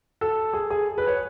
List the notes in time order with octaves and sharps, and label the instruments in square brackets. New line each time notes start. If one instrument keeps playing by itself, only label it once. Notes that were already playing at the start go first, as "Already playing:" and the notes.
[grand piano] A4
G#4
G#4
B4
C#5